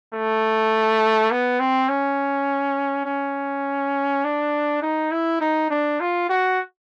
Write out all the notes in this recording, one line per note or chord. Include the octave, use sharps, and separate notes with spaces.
A3
B3
C4
C#4
C#4
D4
D#4
E4
D#4
D4
F4
F#4